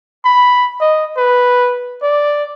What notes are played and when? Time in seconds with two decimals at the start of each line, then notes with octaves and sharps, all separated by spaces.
0.25 B5
0.81 D#5
1.17 B4
2.02 D5